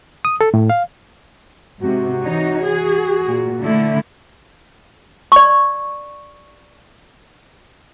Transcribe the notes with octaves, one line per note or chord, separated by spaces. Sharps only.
D#6
A4
A2
F5
G#2 C3 F#4
E3 D#4 C#5
G#4
A#2
D3 A3 E4
D5 C#6